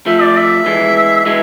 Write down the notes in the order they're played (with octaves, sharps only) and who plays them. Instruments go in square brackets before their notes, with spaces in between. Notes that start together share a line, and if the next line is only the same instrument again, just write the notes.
[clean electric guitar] F3 A3 [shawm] E5
[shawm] D5
E5
[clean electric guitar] E3 G#3
[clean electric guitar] E3 G#3 [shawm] E5